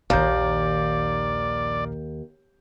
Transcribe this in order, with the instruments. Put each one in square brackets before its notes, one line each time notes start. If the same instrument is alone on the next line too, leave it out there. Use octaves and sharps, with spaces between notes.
[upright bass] A#1 D#3 [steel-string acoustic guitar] D#2 [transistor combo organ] D5 [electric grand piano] F5 A#5 G6